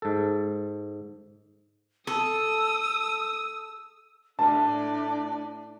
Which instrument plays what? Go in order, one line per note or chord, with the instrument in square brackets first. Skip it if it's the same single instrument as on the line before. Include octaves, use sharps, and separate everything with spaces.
[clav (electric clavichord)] G#2 A4
[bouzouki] A4 [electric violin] D#6 [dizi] E6
[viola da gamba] A2 D5 [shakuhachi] D4 [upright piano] A5